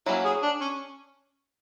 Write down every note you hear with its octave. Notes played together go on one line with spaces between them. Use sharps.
F#3 A#3 C#4 E4
G#4
D4
C#4